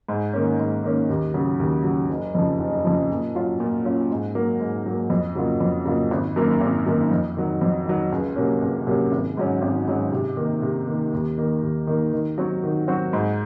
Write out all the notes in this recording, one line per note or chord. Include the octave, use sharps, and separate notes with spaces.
G#2
D#3 A#3 C#4
G#2
D#3 A#3 C#4
D#2
C#3 F#3
D#2
C#3 F#3
F#1
F2 C#3 F3
F#1
F2 C#3 F3
A#2
F#3 C#4 F4
A#2
F#3 C#4 F4
G#2
F#3 A#3
G#2
F#3 A#3
F2
C#3 F#3 A#3 F4
F2
C#3 F#3 A#3 F4
G#1
F#2 D#3 A#3
G#1
F#2 D#3 A#3
F2
D#3 F#3
F2
D#3 F#3
C#2
C3 F#3 A#3 C#4
C#2
C3 F#3 A#3 C#4
G#1
G#2 F#3 C#4
G#1
G#2 F#3 C#4
C3
D#3 A#3
C3
D#3 A#3
D#2
D#3 A#3
D#2
D#3 A#3
D#3
F#3 C4 F#4
D#3
F#3 C4 F#4
G#2